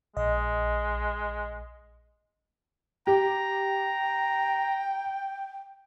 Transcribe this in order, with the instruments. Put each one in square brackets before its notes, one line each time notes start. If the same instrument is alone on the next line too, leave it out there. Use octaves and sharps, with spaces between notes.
[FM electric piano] A#1 D#5 [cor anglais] G#3
[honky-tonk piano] G4 [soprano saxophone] G5 [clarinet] A#5